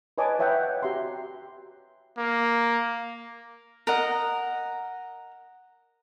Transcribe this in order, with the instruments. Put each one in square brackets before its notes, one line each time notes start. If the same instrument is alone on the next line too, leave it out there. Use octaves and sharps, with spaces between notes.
[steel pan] B4 C#5 D#5 G#5 A5 D6
B4 C#5 E5 F#5 G5
F#4 G4 E5 A#5 C6
[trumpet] A#3
[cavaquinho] A#4 D#5 F#5